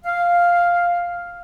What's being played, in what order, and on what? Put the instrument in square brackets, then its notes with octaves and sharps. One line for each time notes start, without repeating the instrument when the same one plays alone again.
[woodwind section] F5